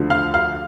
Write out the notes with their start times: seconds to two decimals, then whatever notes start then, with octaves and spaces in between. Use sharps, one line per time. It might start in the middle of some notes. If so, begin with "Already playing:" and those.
Already playing: D2 D3 F3 A3
0.10 F5 F6
0.34 F5 F6